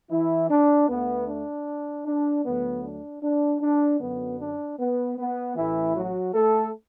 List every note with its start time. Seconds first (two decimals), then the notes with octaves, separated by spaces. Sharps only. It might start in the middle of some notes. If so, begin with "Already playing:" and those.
0.11 E3 E4
0.50 D4
0.89 D2 D3 A3 B3
1.27 D4
2.06 D4
2.45 D2 D3 F#3 A3 B3
2.84 D4
3.23 D4
3.61 D4
4.00 F#2 D3 F#3 B3
4.40 D4
4.79 B3
5.18 B3
5.56 A1 A2 E3 A3 E4
5.95 F#3 F#4
6.34 A3 A4